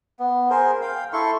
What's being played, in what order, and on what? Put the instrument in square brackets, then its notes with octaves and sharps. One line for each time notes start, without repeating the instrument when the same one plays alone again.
[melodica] B3
G#4 A#4 C5
F5 G5
E4 A4 C6 C#6